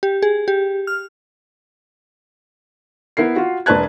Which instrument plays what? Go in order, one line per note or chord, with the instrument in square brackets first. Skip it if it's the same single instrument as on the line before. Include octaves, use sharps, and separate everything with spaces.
[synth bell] G4
G#4
G4
F6
[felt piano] B3 E4 A#4 C7
F4 F#4
E1 D4 B4 A5 F#6 G#6